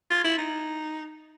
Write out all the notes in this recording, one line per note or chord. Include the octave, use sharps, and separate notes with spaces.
F4
E4
D#4